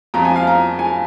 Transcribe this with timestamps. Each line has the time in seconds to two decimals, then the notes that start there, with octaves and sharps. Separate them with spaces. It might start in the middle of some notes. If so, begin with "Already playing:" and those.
0.14 F2 F3 A#5
0.25 G#5
0.36 F5
0.47 A#5
0.79 G#5